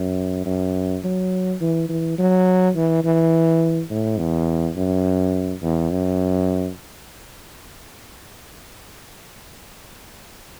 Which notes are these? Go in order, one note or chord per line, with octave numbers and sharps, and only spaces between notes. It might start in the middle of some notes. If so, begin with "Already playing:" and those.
Already playing: F#2
F#2
F#3
E3
E3
F#3
E3
E3
A2
E2
F#2
E2
F#2